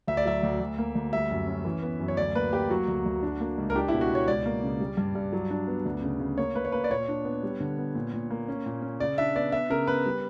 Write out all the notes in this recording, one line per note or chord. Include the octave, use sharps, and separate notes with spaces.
D2 E5
D5
F#3 E5
D2
D2
A#3
D2
G3 E5
F#2
C#4
E3
B3
F#2
C#5
D2 D5
A#3 B4
A#3 G4
F#3 F#4
D2
D2
D4
A#3
C#2
A#4
D4 G4
E4
B2
F#4
B2 C#5
C#2 D5
A#3
C#3
G3
G2
G2
F#3
D4
B3
D2
C#3
C#3
A#3 C#5
A#3 B4
C#5
A#3 B4
D5
A#2 C#5
D4
B3
G3
D3
B3
A#2
A#2
A#3
C#4
A#2
C#4
C#3 D5
D4 E5
B3 D5
B3 E5
C#3 A#4
B3 B4
G3